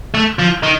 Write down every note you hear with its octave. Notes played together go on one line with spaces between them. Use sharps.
A3
F3
D#3